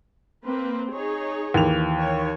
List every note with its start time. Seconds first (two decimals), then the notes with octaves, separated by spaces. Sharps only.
0.44 A#3 C4 B4
0.91 D#4 G#4 C#5
1.54 D#2 E3 F7
2.00 C#5